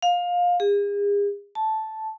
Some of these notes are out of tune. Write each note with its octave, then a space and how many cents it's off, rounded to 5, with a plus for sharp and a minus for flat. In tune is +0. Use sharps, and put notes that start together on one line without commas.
F5 +20
G#4 -40
A5 -5